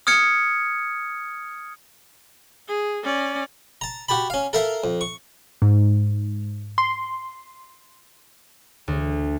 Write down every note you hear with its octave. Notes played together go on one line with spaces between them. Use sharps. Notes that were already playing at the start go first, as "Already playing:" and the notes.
D#6 F6 G#6 C#7
G#4
C#4 D5
A5 A#5
F#4 G4 A5 B5
C#4 F5
A4 A#4 E5 F5 A#5
F2
C#6
G#2
C6
D2